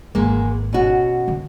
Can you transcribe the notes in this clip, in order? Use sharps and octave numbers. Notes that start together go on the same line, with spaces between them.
G#1 E2 G#3 A#3
B2 C#4 F#4
D3 F3